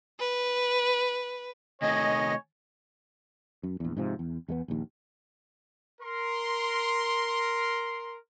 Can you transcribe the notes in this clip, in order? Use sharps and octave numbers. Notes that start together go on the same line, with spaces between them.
B4
C3 D#3 A3 C#5 D#5 G#5
F#2
A#1 E2
G#2 C3 F3
E2
E2 G#3 B3
A#1 D#2
A#4 C6